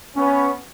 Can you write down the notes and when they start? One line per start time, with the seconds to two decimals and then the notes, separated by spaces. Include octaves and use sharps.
0.16 B3 C#4